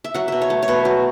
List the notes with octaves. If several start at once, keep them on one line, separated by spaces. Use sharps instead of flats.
E5
F#3 F#5
B2 E5
C#5
A3
C#5
B2 B4
F#3